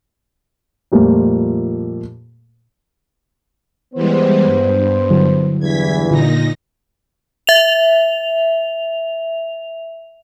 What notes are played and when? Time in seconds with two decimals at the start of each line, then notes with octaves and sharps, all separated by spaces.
0.92 F2 A#2 G3 A3 A#3
3.95 E3 G3 G#3 B3 C5
4.44 G2
5.10 D3 F#3 E4
5.60 E2 G2 E3 G#6 B6
6.10 A#2 D3 D#4 F4 A#6
7.47 E5 F7